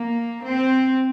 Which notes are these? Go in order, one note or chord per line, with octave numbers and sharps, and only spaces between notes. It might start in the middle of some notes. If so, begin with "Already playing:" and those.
Already playing: A#3
C4